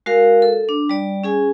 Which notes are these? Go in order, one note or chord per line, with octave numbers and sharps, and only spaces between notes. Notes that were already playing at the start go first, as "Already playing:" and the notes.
G#3 F#4 A#4 F5
A4
D4
G3 D5
C#4 G#4 G#5